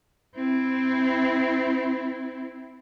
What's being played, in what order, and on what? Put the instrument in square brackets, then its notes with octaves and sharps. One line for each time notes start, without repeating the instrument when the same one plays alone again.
[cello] C4 E4